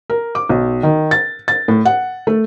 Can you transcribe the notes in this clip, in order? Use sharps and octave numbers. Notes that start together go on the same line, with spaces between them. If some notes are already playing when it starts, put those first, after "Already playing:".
A#4
D6
B1
D#3
A6
A6
A2
F#5
A3